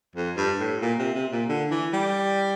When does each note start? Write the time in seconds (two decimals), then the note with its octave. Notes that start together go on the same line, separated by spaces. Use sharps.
0.16 F2
0.37 G2
0.60 A2
0.81 A#2
0.99 C3
1.15 C3
1.32 A#2
1.49 D3
1.71 E3
1.93 G3